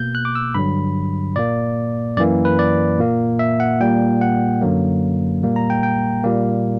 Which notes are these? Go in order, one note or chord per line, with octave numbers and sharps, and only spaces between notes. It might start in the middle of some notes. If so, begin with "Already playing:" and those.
Already playing: B2 A#3 G6
F#6
D6
E6
G2 D3 F#3 B5
A#2 A#3 D5
F#2 E3 A#3 D5
B4
D5
A#2 A#3
E5
F#5
A#2 G3 A#3 G5
F#5
F#2 D3 F#3 A#3
A#2 G3 A#3
A#5
G5
G5
A#2 G3 A#3